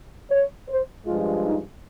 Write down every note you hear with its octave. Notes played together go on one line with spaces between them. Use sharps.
C#5
C5
G2 F3 G#3 F4
D#4